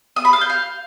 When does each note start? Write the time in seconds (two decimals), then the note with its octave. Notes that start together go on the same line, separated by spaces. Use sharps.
0.16 D#6
0.25 B5
0.33 F5
0.41 G6
0.50 F5